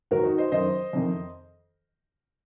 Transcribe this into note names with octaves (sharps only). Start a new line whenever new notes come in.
G#2 D#3 F#4 A#4
D#4 F#4
C5 D#5
F#2 D#3 C5 D#5
F2 C3 D#3